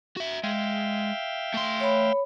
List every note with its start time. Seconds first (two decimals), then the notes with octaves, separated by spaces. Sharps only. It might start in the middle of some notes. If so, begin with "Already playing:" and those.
0.17 F#4 E5
0.43 G#3 E5 F5 G5
1.54 A3 C6
1.80 C#5 B5